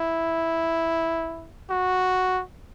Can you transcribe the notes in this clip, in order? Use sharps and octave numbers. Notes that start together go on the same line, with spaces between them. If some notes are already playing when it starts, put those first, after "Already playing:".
Already playing: E4
F#4